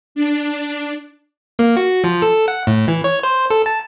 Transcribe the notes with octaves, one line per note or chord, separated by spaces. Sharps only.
D4
A#3
F#4
F3
A4
F#5
A2
E3
C#5
C5
A4
A5